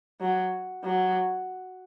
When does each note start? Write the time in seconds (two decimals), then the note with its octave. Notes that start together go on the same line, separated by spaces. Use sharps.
0.21 F#3
0.84 F#3